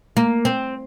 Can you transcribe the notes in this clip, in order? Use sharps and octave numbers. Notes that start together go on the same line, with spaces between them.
A#3
C4